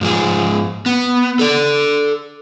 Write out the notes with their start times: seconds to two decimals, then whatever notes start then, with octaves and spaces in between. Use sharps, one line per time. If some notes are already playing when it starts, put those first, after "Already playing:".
0.01 G#2 F3 G#4
0.86 B3
1.39 A4 D5